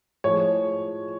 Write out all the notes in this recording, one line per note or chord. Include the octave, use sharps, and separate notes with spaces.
A2 F3 G#3 C#5